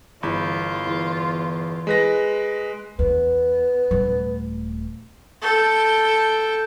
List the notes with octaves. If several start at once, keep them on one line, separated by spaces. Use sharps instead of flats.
G1 E2 F4 B5
E2
G#3 B4 A#6
E2 B3
D#1 A3
A4 G5